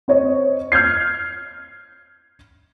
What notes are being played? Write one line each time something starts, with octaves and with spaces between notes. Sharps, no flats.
C4 C5 C#5 D#5
F6 G6 G#6 C7